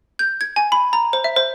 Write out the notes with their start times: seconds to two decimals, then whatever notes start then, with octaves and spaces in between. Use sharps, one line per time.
0.19 G6
0.41 G#6
0.56 G#5
0.72 B5
0.93 A#5
1.13 C5
1.24 E5
1.36 C5